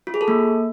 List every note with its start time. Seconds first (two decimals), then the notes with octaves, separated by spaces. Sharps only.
0.07 F4
0.14 G#4
0.21 A4
0.28 A#3